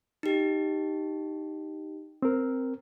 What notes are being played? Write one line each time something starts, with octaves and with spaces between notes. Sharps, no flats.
D#4 G4
C4 A#4